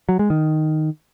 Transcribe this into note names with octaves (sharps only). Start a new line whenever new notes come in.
F#3
G#3
D#3